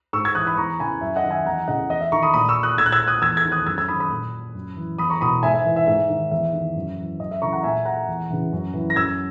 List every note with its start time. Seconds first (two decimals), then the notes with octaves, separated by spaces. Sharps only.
0.13 G#2 C#6 E6
0.25 E6 G#6
0.35 E3 D#6 F#6
0.47 B5 D#6
0.57 E2 A#5 C#6
0.79 C#3 E3 G#5 B5
1.01 F#2 E5
1.16 D#5 F#5
1.23 D#3
1.31 E5 G#5
1.45 E2 F#5 A#5
1.68 C#3 E3 D#5 F#5
1.90 E2 D#5
2.01 E5
2.12 D#3 A#5 C#6
2.23 B5 D#6
2.34 A#2 B5 D#6
2.49 C#6 E6
2.63 D#6 F#6
2.78 A#2 E6 G#6
2.86 F#6
2.92 E6 G#6
3.07 D#6 F#6
3.22 E2 E6 G#6
3.37 E6 G#6
3.45 D#3
3.52 D#6 F#6
3.66 F#2 E6 G#6
3.78 E6 G#6
3.88 D#3 B5 D#6
4.00 B5 D#6
4.11 A#2
4.54 F#2
4.76 E3
4.98 E2 B5 D#6
5.10 A#5 C#6
5.21 B2 B5 D#6
5.43 G#2 E5 G#5
5.54 E5
5.65 E3
5.76 E5
5.87 G#2 E5
6.09 D#3
6.31 E2 E5
6.53 D#3
6.76 F#2
6.97 E3
7.20 F#2 D#5
7.31 E5
7.42 C#3 E3 A#5 C#6
7.53 F#5 A#5
7.63 A#2 E5 G#5
7.85 F#5 A#5
8.08 E2
8.30 C#3 E3
8.53 F#2
8.74 E3
8.90 A#6
8.96 F#2 E6 G#6